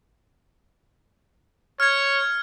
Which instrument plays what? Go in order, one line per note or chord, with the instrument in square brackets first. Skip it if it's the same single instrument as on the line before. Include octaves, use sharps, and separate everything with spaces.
[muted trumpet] C#5 [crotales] F6 G#6